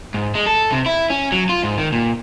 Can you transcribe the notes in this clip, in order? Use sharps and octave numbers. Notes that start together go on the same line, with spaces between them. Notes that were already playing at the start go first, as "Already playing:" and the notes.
G#2
G#3
A4
C3
E4
C#4
F#3
F4
G#2
D#3
A#2